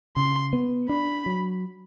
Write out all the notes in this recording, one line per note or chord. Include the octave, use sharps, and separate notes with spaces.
C#3 C6
B3
D4 B5
F#3